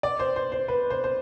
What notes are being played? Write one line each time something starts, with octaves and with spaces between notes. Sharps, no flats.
D5
C5
C5
C5
B4
C5
C5